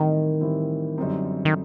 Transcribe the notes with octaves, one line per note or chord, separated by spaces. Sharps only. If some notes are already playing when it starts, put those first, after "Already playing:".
Already playing: A2 D#3 E3 G3 C4
A2 E3 G3 C4
F#2 D3 G3 C4 D#4
D#3